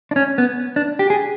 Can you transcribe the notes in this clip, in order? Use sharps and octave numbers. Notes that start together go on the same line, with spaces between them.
D4
C#4
B3
D4
G4
G#4